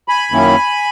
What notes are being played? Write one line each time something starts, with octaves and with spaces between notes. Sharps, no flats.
G#5 B5
F#2 D#3 A#3 C#4 E4